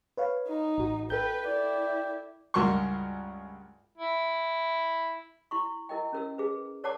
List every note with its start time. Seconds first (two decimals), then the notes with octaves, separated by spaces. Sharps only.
0.17 B4 C#5 F5
0.48 D#4
0.78 A1 F#4
1.10 A4 B4 G5 G6
1.47 E4 D5
2.54 C#2 G2 F#4 A#4 C6 C#6
3.98 E4
5.51 E4 C6 C#6
5.89 E4 A#4 D#5 G5
6.13 C#4 A#4 E6
6.38 G#4 B4
6.84 A#4 C#5 D5 F#5 A5 D6